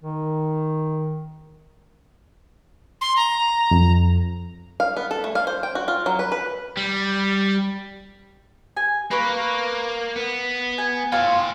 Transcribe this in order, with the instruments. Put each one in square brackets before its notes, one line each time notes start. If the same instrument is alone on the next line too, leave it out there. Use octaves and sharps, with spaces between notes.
[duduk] D#3
[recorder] C6
A#5
[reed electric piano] F2
[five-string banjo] F5
B3
A4
A3
F5
C5
G5
F#4
F4
F#3
B4
B4
[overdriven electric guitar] G3
[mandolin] G#5
[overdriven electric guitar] A#3 [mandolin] B4 C#6
[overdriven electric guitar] B3
[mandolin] G#5
[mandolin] F4 G#5 E6 [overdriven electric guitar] C#5 G5